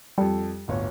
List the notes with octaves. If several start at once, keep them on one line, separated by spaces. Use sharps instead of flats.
F2 G3 A4
D1 G1 C#5